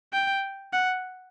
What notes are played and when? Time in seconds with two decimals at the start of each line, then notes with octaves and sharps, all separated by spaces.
0.13 G5
0.73 F#5